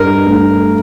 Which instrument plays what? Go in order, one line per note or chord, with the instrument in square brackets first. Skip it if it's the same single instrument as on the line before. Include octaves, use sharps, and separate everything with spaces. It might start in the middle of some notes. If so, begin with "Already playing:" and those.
Already playing: [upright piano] G2 [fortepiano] A#4
[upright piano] A3